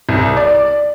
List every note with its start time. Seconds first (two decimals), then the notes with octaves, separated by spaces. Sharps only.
0.09 C2
0.37 D5